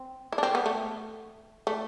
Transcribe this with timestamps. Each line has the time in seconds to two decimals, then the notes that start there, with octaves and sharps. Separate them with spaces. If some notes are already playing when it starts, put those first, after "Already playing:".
Already playing: C4
0.32 E4
0.38 D4
0.43 C4
0.55 B3
0.66 A3
1.67 A3